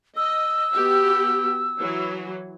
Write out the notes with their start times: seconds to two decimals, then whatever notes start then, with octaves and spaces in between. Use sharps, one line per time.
0.17 D#5 E6
0.73 B3 F#4 G4
1.79 E3 F#3